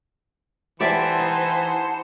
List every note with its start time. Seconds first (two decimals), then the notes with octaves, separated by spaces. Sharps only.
0.80 E3 E4 G4 C5 D5 E5 F#5 A5
1.19 D#4